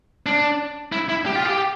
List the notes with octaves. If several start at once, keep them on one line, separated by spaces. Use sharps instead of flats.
D4
E4
E4
G4
F4
G4